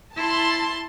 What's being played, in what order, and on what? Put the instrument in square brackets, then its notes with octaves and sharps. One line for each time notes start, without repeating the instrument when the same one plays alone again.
[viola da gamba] E4 [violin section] A5 C6